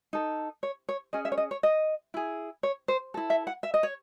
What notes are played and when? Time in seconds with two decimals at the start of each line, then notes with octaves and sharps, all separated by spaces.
0.13 D#4 A4
0.63 C#5
0.89 C#5
1.13 C#4 G#4 D#5
1.25 E5
1.32 C#5
1.37 D#5
1.51 C#5
1.63 D#5
2.14 E4 G#4
2.63 C#5
2.88 C5
3.14 E4 A4
3.30 E5
3.47 F#5
3.63 E5
3.74 D#5
3.83 C#5